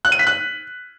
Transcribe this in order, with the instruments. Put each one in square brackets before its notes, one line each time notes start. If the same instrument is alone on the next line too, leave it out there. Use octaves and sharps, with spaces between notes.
[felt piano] F#6
D#7
B6
F#6